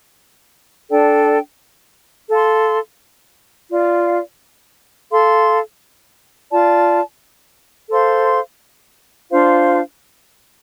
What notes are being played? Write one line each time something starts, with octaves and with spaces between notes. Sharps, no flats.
D4 A4 D5 G5
A4 F5 C6
F4 D5 F5
A4 F5 C6
F4 D5 A5
A4 C5 F5 C6
D4 F4 C5 F5